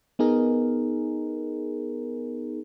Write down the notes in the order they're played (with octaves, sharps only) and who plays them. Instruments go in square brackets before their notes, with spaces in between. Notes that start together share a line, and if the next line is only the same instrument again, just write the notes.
[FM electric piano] B3 D#4 G#4 A#4